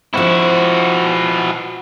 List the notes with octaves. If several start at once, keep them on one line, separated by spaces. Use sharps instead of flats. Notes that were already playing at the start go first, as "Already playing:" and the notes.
F3 C4 E4 F#4